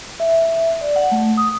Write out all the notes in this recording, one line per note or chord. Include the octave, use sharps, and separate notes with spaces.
E5
E5
D5
F#5
A3
D#6